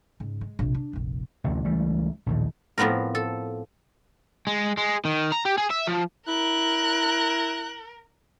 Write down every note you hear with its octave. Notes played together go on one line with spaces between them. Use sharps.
G#2 C#3
G#3
A#1 C3
D4
F1 A#1
A1 D2 C3
C#2 E3 G3 A3
A#1 D#2 A2
A2 F3 B3 C4 A#4
A4
G#3
G#3
D#3
A#5
G4
G#4
E5
F3
E4 A#4 F#6